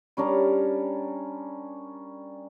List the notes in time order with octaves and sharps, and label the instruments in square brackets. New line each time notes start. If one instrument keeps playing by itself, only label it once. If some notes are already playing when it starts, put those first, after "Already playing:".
[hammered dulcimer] G3 C#4 D4 A#4